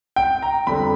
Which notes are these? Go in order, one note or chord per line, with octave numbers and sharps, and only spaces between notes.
G5
A#5
F2 D3 G3 B5